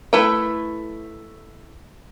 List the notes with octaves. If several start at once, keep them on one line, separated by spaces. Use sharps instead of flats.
A3 E4 A4 B4 G5